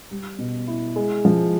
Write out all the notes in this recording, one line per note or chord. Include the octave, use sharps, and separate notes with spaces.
G3
B2
E4
G#3
F3